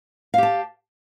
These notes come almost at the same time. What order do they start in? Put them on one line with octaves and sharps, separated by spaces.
F5 G4 A5